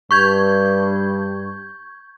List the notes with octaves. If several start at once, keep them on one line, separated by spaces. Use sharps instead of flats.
G2 C#6 G6 G#6